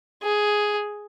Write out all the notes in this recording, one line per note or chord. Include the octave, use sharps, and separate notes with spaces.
G#4